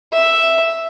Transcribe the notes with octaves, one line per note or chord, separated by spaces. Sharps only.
E5